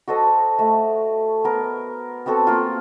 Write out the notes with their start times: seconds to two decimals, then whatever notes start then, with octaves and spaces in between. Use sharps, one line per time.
0.08 F#4 A4 C5 D#5
0.59 A3
1.44 B3 A#4
2.26 B3 C4 F#4 A4
2.47 A#3 F4